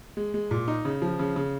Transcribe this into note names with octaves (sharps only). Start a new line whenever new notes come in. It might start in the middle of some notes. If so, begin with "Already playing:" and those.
G#3
G#3
A#2
D#4
C#3
F3
C#3
C#3